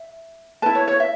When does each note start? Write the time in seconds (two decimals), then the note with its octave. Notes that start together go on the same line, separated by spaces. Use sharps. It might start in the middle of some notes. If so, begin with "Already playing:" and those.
Already playing: E5
0.62 E4 B4 A5
0.75 C#5
0.88 C#5
1.00 E5